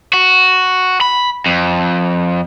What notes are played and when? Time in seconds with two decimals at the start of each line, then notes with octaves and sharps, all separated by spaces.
0.14 F#4
1.01 B5
1.46 F2